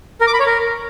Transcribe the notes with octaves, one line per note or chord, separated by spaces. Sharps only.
A#4
D6
B5
C#5
A#4